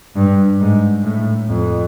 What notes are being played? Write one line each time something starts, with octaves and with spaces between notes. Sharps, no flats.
G2
G#2
A2
F2